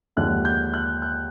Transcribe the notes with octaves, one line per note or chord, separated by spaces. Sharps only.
D#2 D3 F3 G#3 F#6
G6
F#6
F#6